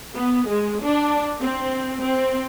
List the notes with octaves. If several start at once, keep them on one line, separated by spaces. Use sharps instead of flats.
B3
G#3
D4
C4
C4